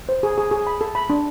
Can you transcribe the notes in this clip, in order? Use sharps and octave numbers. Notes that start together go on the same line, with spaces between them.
C5
G#4
G#4
G#4
B5
A4
B5
D4